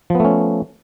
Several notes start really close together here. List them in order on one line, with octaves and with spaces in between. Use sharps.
F3 B3 A3 C#4